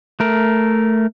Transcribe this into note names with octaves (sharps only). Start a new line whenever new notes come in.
A3 A#4